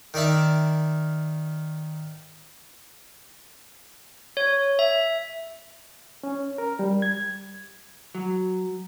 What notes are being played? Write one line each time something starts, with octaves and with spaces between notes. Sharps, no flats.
D#3 A#4 D5 E5 A5
C#5
E5
C#4
A#4
G3
G#6
F#3